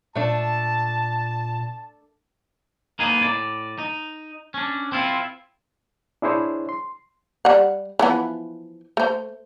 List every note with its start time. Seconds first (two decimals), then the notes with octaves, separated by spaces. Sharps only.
0.15 A#2 A3 D4 A5
2.99 A#3 B3 D#4 G#4
3.21 A2 D5
3.78 D#4
4.54 C#4 D4
4.92 C4 E4 F4
6.22 D4 E4 G#4 C5 C#5
6.69 C6
7.45 G3 F#5
7.99 E3 F3 B3
8.97 A3 C5